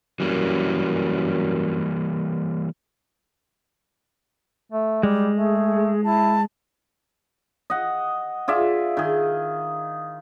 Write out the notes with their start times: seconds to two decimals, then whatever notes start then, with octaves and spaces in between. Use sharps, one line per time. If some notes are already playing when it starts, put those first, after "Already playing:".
0.20 F#2 E3 G3 A#3
4.72 A3
5.03 G3 G#3
5.36 A3 G#4
6.04 E4 A5
7.70 D#5 F#5
8.48 F4 G#4 D5 E5
8.97 D#3 G#4